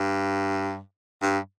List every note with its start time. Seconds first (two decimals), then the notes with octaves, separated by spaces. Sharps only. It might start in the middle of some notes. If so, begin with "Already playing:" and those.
Already playing: G2
1.22 G2